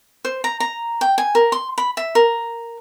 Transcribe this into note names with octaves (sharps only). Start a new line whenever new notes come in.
C5
A#5
A#5
G5
G#5
A#4
C6
B5
E5
A#4